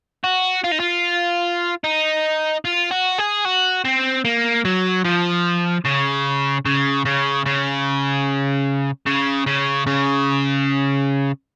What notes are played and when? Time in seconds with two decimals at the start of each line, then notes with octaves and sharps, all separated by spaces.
0.24 F#4
0.64 F4
0.72 D#4
0.80 F4
1.84 D#4
2.65 F4
2.91 F#4
3.18 G#4
3.45 F#4
3.85 C4
4.25 A#3
4.65 F#3
5.05 F3
5.85 C#3
6.65 C#3
7.06 C#3
7.46 C#3
9.06 C#3
9.46 C#3
9.87 C#3